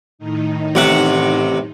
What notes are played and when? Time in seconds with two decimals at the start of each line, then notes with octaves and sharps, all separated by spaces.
0.19 A2 D#3 D#4
0.75 A1 C3 F#5